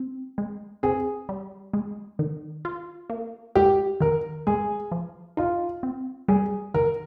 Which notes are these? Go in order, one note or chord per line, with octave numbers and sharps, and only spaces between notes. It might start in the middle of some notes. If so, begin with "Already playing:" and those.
Already playing: C4
G#3
C4 G#4
G3
G#3
D#3
F4
A#3
G#3 G4
D#3 A#4
G#3 G#4
F3
D#4 F4
C4
G3 G#4
D#3 A#4